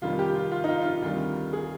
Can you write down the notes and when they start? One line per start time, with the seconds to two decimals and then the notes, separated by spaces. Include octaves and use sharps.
0.02 F1 F2 D#3 G3 F4
0.19 G4
0.35 F4
0.52 F4
0.64 D#4
0.68 F4
0.81 F4
0.86 D#4
1.02 D2 C3 D#3 G3 F4
1.53 G#4